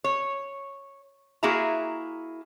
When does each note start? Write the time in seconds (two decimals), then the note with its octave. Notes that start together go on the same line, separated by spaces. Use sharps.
0.04 C#5
1.43 A#3 E4 F#4 G#4 E5 A#5